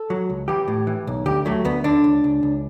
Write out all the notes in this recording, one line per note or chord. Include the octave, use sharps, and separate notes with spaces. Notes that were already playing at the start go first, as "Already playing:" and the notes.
Already playing: A4
F#3
C#2
E3 G4
A2
E3
B1
D2 G4
F#3 A3
D2 B3
D3 D4
C#2
C#2
C#2